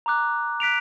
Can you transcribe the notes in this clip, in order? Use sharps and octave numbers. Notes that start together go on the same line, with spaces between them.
A#5 D6 F#6
F#6 B6 D7 F7